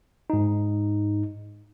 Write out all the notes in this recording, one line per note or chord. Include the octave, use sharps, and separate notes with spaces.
G#2 D#4